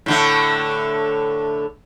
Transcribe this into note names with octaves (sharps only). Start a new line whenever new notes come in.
A2 D3 A3